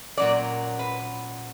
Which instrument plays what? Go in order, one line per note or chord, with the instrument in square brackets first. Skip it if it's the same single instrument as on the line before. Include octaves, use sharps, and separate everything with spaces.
[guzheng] A#2 F#3 C#4 [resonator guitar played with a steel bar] D5
[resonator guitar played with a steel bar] B4